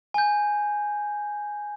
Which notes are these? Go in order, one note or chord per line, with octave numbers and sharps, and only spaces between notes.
G#5 G6